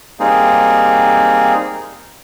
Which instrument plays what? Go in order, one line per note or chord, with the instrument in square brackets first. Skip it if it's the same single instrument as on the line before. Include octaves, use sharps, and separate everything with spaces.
[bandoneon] G3 A#3 C4 D#4 G#4